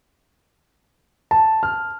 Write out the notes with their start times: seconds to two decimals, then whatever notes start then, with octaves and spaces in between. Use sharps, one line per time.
1.31 A5
1.63 F6